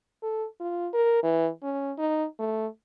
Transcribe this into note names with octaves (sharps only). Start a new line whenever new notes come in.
A4
F4
A#4
E3
C#4
D#4
A3